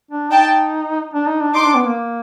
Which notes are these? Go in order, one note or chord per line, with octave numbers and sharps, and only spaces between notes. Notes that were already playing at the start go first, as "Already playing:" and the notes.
D4
D#4 G5 A5
D4
D#4
D4
D#4 C6 D6
D4
B3
A#3